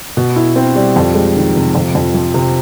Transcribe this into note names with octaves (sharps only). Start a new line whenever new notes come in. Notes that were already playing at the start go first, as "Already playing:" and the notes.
B2
E4
C4
G3
F2
G#3
D#3
C3
F2
F2
F3
C3